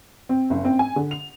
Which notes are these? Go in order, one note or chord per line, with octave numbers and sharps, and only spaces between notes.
C4
F#1
C4
G#5
D3
F7